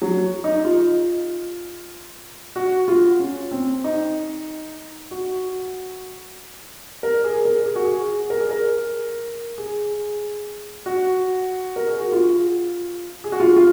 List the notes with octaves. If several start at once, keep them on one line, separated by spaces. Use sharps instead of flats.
F#3
D#4
F4
F#4
F4
C#4
C4
D#4
F#4
A#4
G#4
A#4
G#4
F#4
G#4
A#4
G#4
A#4
G#4
F#4
A#4
G#4
F#4
F4
G#4
F#4
F4
F4